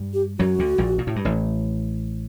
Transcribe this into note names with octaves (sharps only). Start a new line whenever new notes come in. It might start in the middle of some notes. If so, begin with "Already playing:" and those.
Already playing: G2 G3
G4
F#2 F#3 F#4
D2 D3
A#1 A#2
A#2
A2
G2
A1 A2